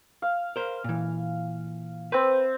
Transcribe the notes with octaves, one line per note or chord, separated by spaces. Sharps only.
F5
A#4 C5
A#2 E3
C4 B4 C5